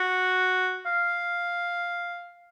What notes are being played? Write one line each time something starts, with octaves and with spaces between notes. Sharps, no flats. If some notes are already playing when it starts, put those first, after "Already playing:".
Already playing: F#4
F5